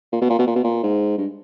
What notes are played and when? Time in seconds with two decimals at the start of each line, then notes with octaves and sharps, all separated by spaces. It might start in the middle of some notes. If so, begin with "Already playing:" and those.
0.13 A#2
0.21 B2
0.30 A#2
0.39 B2
0.47 A#2
0.55 B2
0.64 A#2
0.83 G#2
1.18 G2